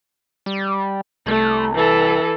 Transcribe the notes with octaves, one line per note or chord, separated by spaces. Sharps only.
G3
C2 A3
E3 A4